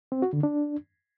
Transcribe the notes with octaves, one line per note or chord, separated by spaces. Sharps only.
C4
F#4
D3
D4